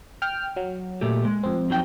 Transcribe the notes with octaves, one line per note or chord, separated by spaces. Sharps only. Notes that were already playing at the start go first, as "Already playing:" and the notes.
G5 F6
F#3
A#2 A3 G4
G#3
F2 C4
F#3 D#4 G5